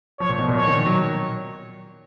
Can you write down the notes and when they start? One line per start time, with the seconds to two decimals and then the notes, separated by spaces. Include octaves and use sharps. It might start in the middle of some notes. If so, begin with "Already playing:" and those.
0.20 F3 C#5
0.29 A#2
0.39 B2
0.48 A#2
0.58 C#5
0.67 D#3
0.86 F#3